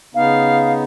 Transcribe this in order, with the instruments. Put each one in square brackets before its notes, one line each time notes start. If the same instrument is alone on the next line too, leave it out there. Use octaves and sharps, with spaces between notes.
[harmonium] C#3 B3 D#4 [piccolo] F5